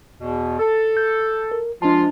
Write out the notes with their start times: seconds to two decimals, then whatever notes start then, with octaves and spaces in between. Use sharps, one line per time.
0.21 E2 B2
0.59 A4
0.97 G6
1.52 A#4
1.82 F3 G#3 D4 F4 A5